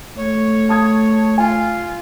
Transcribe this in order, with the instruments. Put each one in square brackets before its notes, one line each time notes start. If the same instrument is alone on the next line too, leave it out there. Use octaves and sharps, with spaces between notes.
[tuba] A3 [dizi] C#5
[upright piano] A5 D#6 G#6
[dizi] F4 [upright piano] G#5